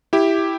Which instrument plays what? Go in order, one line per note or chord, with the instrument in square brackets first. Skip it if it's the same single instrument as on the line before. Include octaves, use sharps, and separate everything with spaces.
[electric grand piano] E4 G4